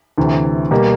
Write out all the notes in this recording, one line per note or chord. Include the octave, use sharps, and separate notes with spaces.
D2 C3 E3
B2 G3 A#3